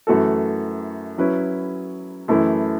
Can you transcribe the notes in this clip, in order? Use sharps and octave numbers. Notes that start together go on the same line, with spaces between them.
F#2 E3 A3 F#4 A4
F#3 C#4 E4 B4
F#2 E3 A3 E4